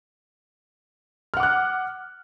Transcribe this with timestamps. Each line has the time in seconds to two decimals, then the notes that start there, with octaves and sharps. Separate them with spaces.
1.34 F6
1.37 F#5
1.40 D6
1.43 F#6